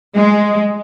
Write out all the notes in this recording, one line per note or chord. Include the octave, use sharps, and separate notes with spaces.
G#3